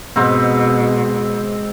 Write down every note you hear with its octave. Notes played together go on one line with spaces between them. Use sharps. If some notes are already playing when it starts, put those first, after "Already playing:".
G#2 B2 C4